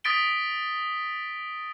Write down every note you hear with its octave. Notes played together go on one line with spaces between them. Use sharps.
D#6 A6 B6 D7 G7